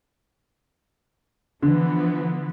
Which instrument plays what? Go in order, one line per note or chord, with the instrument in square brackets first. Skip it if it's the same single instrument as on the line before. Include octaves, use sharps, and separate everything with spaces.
[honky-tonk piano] D3 [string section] E3 F3 B3